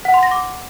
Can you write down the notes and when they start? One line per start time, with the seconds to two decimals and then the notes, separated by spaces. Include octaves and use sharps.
0.05 F#5
0.14 C6
0.23 A#6
0.31 D6